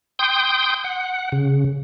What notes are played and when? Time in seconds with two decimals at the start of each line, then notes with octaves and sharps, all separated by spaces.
0.19 G5 C6 D#6 G6
0.84 F#5
1.32 C#3